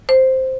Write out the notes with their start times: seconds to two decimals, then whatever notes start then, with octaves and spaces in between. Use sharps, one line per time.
0.09 C5